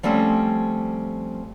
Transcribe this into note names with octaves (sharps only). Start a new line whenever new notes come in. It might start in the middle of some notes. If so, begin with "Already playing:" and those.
F3 G3 A3 C4 C#4